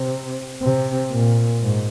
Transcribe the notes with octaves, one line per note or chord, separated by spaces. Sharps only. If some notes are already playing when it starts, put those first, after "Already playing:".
Already playing: C3
C3
A#2
G#2